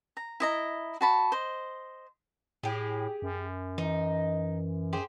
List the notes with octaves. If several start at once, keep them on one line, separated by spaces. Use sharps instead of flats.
A#5
E4 D#5 A#5
F#4 A5 B5
C5 D#5
A2 G4 G#4
F#2
E3 D#4
G4 G#4 C5